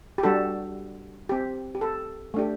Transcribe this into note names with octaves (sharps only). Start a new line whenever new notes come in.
G4
G3 D4 F#4 A4
C4 G4
G4
A4
A3 D4 G4